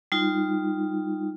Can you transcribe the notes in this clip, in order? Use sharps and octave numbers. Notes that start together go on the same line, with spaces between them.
G3 D#4 F4